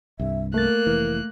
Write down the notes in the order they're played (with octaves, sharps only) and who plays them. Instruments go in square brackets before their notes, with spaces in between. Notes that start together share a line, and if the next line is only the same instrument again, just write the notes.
[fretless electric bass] C2 G2 [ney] E5
[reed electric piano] A3 A6 [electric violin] A#3 F#6 [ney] A#4
[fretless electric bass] F1 E3